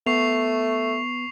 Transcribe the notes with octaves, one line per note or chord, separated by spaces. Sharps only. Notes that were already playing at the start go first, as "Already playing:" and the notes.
A3 B3 C#6 C7 F7